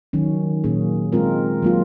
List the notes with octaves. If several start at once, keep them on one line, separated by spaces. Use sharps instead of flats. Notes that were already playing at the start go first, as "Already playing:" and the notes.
D#3 F#3 C#4
A#2 F#3 A#3 C#4 G#4
G#3 C4 F4 A#4
F#3 A#3 F4